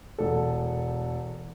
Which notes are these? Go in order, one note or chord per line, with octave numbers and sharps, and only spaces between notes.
E1 A4